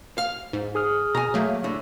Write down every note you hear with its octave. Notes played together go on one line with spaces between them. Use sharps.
F5 F6
G#2
G#4 D#6 F6
B2 G#5 A#5
F#3 A3 A#3
A2 D3